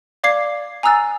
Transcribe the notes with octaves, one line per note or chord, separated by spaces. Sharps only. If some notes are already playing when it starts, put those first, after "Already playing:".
D5 F5 D6 G#6 C7
G#5 A#5 D#6 E6 F#6 A6